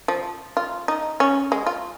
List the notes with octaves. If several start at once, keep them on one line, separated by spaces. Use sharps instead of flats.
F3
F4
D#4
C#4
G#3
F4